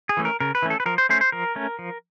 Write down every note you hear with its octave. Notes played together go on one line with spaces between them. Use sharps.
G#4
E3 A3 C#4
A#4
C#3 A#4
B4
E3 A3 C#4
A4
B4
F3 A#4
C5
A3 C#4 C5
C5
F3 A#4
A3 C#4
F3